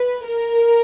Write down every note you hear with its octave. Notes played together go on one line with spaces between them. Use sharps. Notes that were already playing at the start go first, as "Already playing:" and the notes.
Already playing: B4
A#4